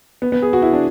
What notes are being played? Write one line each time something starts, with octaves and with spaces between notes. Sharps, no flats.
B3
B3
G#4
F#4
E4
D4